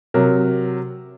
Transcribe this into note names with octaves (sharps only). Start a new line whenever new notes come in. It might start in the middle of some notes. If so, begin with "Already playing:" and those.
C3 F#3 A#4